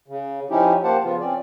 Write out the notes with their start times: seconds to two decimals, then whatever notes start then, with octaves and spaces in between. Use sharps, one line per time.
0.08 C#3
0.50 F3 C#4 D#4 E4 G4
0.83 A#3 G4 C5 F#5 A5
1.04 C#3 F3 B3 F4
1.21 C4 C#4 D5